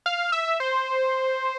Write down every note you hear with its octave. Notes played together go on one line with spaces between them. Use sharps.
F5
E5
C5